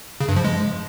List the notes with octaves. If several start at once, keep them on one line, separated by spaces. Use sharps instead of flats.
C#3
G2
F3
G#3